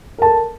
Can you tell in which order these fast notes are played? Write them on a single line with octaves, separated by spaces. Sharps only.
A#4 A5 A4